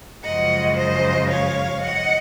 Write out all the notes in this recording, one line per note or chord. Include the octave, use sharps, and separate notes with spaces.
F#2 C#3 F3 G#3 D#5 F#5
C5 D#5
C#5 F5
D#5 F#5